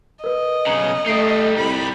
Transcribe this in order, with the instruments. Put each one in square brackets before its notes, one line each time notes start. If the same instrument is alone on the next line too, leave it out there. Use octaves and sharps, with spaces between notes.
[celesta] A#4 B4 [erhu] D#5
[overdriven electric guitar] B1 C#3 [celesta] A#5 C#7 F#7
[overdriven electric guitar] G3 D#4 [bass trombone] A3 [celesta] D#6 C7 D7
[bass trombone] C2 [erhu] B5